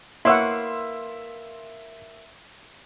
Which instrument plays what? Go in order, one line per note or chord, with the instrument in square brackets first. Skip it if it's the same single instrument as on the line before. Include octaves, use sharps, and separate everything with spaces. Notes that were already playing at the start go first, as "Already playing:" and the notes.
[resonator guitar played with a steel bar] A#3 B4 [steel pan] E4 C#5 F#5 [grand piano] E5 [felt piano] C6 E6